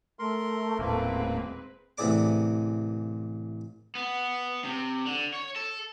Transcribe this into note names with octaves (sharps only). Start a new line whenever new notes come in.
A3 A#4 C6
D#1 A2 G#3 A#3 C4 B4
A1 C3 E3 G#4 D5 D6
B3
C3
D3
C#5
A4